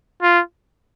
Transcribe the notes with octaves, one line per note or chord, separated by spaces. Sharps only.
F4